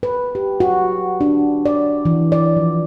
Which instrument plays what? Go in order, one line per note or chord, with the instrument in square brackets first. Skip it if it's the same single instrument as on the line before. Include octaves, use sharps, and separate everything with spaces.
[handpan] B4
G4
F#4
D4
D5
E3
D5
F3